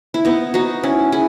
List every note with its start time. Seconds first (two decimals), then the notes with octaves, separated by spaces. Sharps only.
0.14 E4
0.25 B3 D#4
0.54 D#4 F#4
0.83 C#4 E4
1.12 E4 G#4